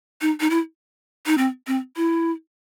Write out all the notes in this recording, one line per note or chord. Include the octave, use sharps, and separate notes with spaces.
D#4
D#4
E4
D#4
C4
C4
E4